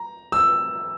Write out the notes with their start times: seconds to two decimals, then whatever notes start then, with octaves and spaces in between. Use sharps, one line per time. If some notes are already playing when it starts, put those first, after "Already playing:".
Already playing: A#5
0.32 E6